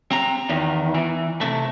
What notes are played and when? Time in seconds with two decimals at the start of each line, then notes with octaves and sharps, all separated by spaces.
0.11 C4 A#5
0.49 E2 D#3
0.95 E3
1.41 C3 A3